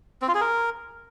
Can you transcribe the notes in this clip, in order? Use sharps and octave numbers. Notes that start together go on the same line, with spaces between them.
C4
F4
G#4
A#4